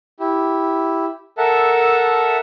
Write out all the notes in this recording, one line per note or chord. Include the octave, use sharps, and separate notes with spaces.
E4 G4
A4 A#4 E5 F#5 A5